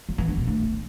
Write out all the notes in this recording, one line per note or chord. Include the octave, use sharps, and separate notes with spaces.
F#3
E3
D4
B2
A3